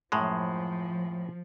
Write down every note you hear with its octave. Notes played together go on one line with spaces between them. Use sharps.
F#2 A2 F3 G#3